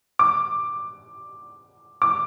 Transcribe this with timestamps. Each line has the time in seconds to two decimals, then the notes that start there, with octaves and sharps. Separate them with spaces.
0.19 D6
2.02 D6